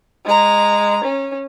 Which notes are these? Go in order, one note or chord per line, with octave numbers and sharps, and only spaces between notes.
G#3 A#5
C#4